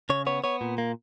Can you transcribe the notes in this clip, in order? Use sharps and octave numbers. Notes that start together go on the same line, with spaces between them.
C#3 C#5
B3 C#5
B3 C#5
A#2
A#3